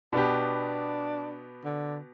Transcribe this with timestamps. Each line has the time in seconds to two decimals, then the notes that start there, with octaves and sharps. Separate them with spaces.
0.13 B2 B3 D4 G4
1.65 D3